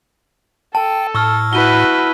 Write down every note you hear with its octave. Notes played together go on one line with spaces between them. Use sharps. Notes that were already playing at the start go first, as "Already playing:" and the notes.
A4 G5 A5
A2 C#6 E6 F6
E4 F#4 B4 D#7 G7